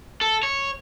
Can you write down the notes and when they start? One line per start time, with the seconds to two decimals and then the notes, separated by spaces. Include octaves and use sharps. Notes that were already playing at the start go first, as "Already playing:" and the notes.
0.21 A4
0.43 C#5